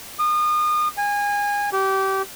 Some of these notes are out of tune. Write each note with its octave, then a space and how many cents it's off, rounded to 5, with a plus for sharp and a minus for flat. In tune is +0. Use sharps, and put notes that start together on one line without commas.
D#6 -35
G#5 -25
G4 -25